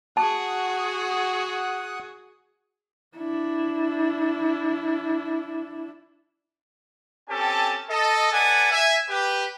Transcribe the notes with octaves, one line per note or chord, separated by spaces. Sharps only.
F#4 G#4 F#5 A5 D#6 F#6
D4 E4
C4 C#4 G4 A4 G#5 A5
A4 D#5
A4 B4 D5 F#5 G#5
E5 G#5
G4 B4